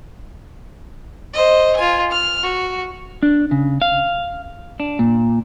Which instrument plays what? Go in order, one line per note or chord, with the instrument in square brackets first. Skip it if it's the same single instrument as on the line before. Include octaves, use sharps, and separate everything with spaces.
[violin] C5 D#5
F4 G#5
F6
F#4
[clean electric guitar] D4
C#3
F5
D4
A#2